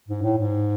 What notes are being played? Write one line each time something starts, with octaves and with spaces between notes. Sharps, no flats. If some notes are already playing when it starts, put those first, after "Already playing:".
G#2
A2
G#2